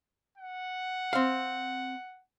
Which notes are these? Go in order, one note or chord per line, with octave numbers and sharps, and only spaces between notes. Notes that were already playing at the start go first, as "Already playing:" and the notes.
F#5
C4 F5